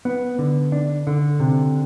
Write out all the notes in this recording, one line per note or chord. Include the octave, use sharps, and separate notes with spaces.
B3
D3
D4
D3
C3